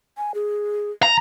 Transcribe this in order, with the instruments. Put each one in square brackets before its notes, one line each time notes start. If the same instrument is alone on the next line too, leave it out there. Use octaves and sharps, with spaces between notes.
[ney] G#5
G#4
[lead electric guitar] A#5